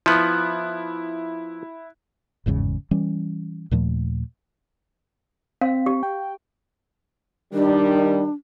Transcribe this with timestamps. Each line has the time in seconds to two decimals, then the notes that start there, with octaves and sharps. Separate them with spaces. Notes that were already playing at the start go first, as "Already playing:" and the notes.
0.06 F3 B3 E4 F#6
2.46 G1 E2 G#2 C#3
2.91 E3 G3 C#4
3.71 D#2 A#2 F3 A3
5.61 C4 F5
5.86 G4
6.03 G5
7.54 D#3 G3 D4